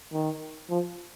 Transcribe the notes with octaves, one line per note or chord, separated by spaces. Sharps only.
D#3
F3